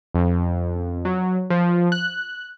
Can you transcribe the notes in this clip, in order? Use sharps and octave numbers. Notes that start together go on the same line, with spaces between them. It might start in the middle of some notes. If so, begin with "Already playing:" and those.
F2
F#3
F3
F#6